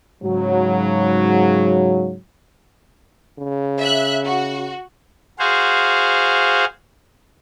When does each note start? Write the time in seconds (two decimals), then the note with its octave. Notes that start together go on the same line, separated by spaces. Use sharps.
0.23 G#2 C#3 F#3
3.39 C#3
3.80 E5 F#6
4.25 F#4
5.39 F#4 G#4 C5 F5